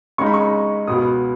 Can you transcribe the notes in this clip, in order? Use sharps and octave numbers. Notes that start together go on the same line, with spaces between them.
C#3 G#3 D#4 C#6
B5
C#6
C#2 B2 B3 D#6